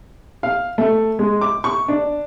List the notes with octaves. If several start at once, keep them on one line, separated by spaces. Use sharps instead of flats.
F5
A3
G#3
D6
C#6
D4